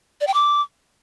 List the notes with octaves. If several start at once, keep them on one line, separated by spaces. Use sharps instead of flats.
D5
G5
D6